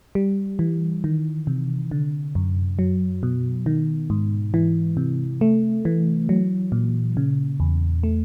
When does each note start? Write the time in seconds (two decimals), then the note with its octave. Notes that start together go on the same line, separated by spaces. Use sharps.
0.15 G3
0.59 E3
1.04 D#3
1.47 C3
1.91 D3
2.35 F#2
2.79 F#3
3.23 B2
3.66 D#3
4.10 G#2
4.54 E3
4.97 C3
5.41 A3
5.85 E3
6.29 F#3
6.72 A#2
7.17 C#3
7.60 E2
8.03 A3